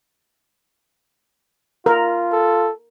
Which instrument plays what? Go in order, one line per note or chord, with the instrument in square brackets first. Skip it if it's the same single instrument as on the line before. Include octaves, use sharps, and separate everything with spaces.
[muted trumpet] F4 [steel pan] A#4
[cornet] A4